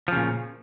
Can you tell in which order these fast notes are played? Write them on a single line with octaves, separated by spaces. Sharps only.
F3 C#3 A#2